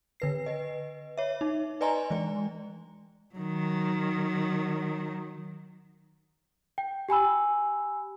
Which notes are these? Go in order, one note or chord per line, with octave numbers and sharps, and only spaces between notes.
D3 B4 C7
B4 D#5
C#5 E5
D#4
B4 D5 D#5 G#5 A#5 C6
E3 G#3 D5
D#3 F#3
G5
G4 G#5 B5 E6